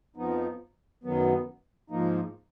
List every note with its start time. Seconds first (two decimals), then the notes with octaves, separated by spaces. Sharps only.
0.16 F2 F3 B3 D#4
1.04 F#2 D#3 F#3 B3
1.90 G#2 F3 A#3 D#4